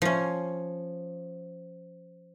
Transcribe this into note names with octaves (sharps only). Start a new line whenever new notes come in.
F3 C#4